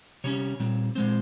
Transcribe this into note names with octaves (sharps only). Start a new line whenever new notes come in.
C3 G3 C#4 C#5
A#2 G3 C4
A#2 G#3 C4 C5